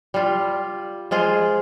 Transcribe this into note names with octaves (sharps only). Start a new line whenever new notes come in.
G3 F4
F3 G#3 F4 G#4